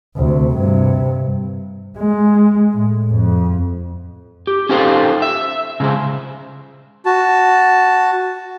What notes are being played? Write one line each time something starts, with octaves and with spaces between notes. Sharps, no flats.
D2 C3
G2 C3
G#3
A2
F2
G4
C#4 D#4 F4 G4 A4 C5
E5
C#3 G#3 C5
F#4 A5